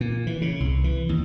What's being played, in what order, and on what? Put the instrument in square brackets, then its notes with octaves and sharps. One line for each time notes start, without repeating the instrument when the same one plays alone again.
[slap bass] A#2
E3
C#3
C2
E3
D#2